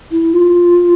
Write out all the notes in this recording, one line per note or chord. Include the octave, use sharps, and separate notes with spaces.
E4
F4